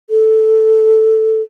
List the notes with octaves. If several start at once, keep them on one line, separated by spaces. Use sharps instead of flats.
A4